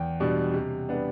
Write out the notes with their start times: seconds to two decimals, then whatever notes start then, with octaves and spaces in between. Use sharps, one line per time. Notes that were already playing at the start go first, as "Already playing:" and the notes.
Already playing: E2 G5
0.20 B2 G3 D4
0.54 C3
0.89 G3 B3 D4